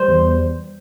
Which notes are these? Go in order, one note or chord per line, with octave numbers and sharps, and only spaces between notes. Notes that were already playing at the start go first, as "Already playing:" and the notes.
Already playing: G3 C5
E2